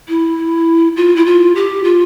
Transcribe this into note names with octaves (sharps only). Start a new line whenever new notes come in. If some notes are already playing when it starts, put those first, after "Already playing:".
E4
F4
E4
F4
G4
F4